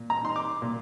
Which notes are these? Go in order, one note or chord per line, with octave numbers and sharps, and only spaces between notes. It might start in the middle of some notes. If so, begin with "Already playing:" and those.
Already playing: A#2
A#5
D#4 C6
D6
A#2